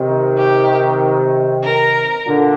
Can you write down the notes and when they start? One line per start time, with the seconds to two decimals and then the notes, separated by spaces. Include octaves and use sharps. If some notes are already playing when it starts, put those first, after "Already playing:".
Already playing: C3 D#3
0.38 G4
1.63 A#4
2.26 A#2 D3